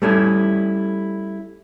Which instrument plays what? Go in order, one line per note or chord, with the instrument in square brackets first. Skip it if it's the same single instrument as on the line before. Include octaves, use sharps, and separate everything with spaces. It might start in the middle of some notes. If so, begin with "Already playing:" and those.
[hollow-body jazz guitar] G3 A3 C#4 E4